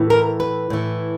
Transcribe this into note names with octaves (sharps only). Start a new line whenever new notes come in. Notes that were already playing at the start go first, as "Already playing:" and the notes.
Already playing: A2 E3
A#4
B4
A2 E3